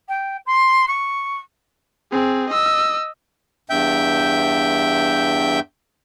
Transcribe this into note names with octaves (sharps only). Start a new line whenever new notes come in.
G5
C6
C#6
C4 G#4
D#5 E6
E2 G2 E5 G5 G6